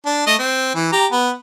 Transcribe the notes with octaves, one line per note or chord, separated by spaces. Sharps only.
D4
A3 D#5
C4
E3
G4 A#5
B3